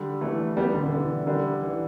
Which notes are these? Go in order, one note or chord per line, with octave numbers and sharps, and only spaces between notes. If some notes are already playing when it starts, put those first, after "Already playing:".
Already playing: D3 G3
E3 A3
G3 B3
D3 G3
D3
E3
D3 G3
E3